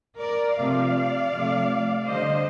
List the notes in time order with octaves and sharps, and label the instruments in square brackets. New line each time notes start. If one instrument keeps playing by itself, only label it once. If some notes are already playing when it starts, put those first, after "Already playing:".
[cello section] A#4 D5
C3 F3 A3 D5 F5
C3 F3 A3
D3 G3 C5 D#5